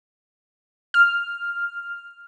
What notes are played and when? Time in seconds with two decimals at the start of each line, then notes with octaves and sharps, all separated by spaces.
0.94 F6